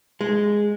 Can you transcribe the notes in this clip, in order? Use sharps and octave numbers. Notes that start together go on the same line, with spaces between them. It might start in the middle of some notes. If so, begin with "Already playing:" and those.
G#3